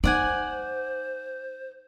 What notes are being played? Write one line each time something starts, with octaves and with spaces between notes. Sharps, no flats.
D#4 C5 D5 F#5 G#5